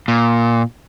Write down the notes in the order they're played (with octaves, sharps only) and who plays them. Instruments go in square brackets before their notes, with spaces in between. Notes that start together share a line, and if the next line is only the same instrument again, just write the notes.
[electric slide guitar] A#2